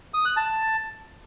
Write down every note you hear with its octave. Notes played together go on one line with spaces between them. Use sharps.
D#6
F#6
A5